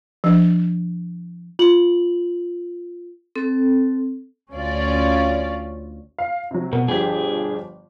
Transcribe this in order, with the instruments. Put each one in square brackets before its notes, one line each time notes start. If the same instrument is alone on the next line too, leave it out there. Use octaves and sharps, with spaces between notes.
[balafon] F3 D4
[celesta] F4 F#7
[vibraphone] C4 A4
[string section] D2 C#4 F4 D5
[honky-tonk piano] F5
C3 F#3
[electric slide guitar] B2 [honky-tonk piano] A#4 F#5
[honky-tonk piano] G1 F3 G4 [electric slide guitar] D4 G#4